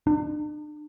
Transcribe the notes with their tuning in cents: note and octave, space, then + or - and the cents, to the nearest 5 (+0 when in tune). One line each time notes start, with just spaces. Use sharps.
D4 +40